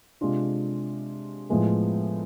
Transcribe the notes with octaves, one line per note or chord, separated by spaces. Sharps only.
C3 G#3 D4 F4
A2 F3 G#3 B3